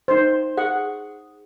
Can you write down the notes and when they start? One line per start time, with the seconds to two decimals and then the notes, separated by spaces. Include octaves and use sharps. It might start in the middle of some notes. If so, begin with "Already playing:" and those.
0.08 D#4 C5
0.58 G#4 F#5